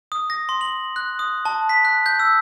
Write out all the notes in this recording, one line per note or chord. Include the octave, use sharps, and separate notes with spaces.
D#6
A#6
C6
F#7
F#6
D#6
A5
B6
F#6
G6
E6